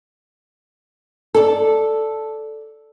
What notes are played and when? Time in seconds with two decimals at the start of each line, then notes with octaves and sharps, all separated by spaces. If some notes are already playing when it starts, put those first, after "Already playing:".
1.34 A4 D5